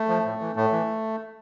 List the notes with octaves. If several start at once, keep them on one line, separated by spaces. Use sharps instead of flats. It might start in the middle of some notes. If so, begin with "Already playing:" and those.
Already playing: A3
F3
A2
E3
A2 A3
E3